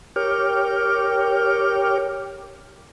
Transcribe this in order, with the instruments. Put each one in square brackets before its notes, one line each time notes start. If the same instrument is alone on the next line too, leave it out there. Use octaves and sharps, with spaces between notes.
[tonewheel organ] G4 A#4 C#5 G5 D6 F6